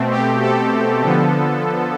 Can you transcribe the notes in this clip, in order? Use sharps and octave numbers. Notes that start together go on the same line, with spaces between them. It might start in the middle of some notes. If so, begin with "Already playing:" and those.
Already playing: B2 A3 C4
G4
A4
D3 F3 B3